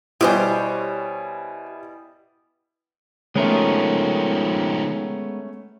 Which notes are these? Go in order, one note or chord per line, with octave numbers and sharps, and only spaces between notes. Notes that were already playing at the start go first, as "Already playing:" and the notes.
B2 G3 E4 G4 C5 C#5 G#5
D#3 F3 G#3 A3 B3 C#4 A#4